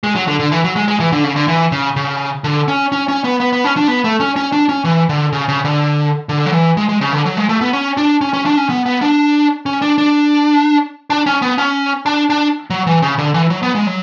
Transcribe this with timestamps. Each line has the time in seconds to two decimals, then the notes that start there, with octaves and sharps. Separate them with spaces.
0.04 G#3
0.15 F#3
0.27 D3
0.39 D3
0.52 E3
0.64 F#3
0.76 G#3
0.88 G#3
1.00 E3
1.12 D3
1.24 C#3
1.36 D3
1.48 E3
1.72 C#3
1.96 C#3
2.44 D3
2.68 C#4
2.92 C#4
3.08 C#4
3.24 B3
3.40 B3
3.53 B3
3.64 C#4
3.77 D4
3.88 B3
4.04 A3
4.20 C#4
4.36 C#4
4.52 D4
4.69 C#4
4.84 E3
5.09 D3
5.32 C#3
5.49 C#3
5.65 D3
6.29 D3
6.46 F#3
6.53 E3
6.77 G#3
6.89 G#3
7.01 C#3
7.13 D3
7.25 F#3
7.37 G#3
7.49 A3
7.61 B3
7.73 C#4
7.97 D4
8.21 C#4
8.33 C#4
8.46 D4
8.57 C#4
8.70 B3
8.86 B3
9.02 D4
9.66 C#4
9.82 D4
9.98 D4
11.10 D4
11.26 C#4
11.42 B3
11.58 C#4
12.06 D4
12.30 D4
12.70 F#3
12.87 E3
13.02 C#3
13.18 D3
13.34 E3
13.50 F#3
13.63 B3
13.75 G#3
13.87 F#3